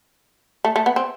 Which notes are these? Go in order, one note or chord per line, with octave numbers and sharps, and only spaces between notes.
A3
A3
B3
C4